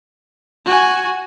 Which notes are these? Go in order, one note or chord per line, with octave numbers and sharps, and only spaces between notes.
F#4 G#5